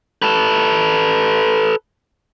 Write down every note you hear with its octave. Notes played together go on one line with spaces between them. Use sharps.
A4 B4